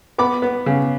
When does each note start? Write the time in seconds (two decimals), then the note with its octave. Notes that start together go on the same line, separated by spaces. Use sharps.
0.18 B3 B5 D6
0.42 B3
0.66 C#3